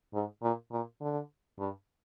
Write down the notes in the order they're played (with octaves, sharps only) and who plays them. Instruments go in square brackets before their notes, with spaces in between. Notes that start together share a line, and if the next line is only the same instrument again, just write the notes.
[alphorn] G#2
A#2
A#2
D3
G2